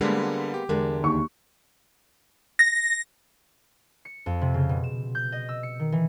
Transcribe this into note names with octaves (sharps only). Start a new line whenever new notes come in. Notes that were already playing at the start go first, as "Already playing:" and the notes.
D3 G3 G#3 A#3 B3
G4
E2 D3 G#3 A#4
D#2 C#6
A#6
C#7
F2
C3
C#3
B2
E7
G6
D#5
E6
C#7
D#3
E3